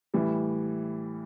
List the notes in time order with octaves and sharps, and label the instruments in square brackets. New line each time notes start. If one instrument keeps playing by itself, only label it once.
[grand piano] A2 E3 G3